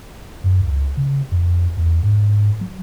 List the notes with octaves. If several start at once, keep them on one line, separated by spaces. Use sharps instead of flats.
F#2
C#2
C#3
F2
E2
G#2
F#3